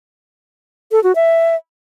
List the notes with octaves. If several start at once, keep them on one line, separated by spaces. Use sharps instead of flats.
A4
F#4
E5